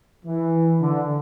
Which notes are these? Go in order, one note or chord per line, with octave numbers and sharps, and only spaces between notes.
E3
D3